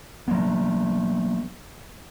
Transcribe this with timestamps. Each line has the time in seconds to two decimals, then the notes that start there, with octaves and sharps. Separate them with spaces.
0.28 F#3 A#3 B3